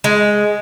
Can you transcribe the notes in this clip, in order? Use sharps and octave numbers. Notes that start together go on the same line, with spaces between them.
G#3